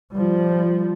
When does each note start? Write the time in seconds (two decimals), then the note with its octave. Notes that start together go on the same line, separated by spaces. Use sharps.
0.12 F3 G3